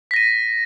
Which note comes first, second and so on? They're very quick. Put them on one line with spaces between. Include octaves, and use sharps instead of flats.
B6 A#6 D#7